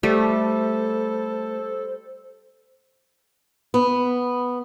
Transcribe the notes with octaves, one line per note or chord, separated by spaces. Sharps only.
G3 A3 A4 C5
B3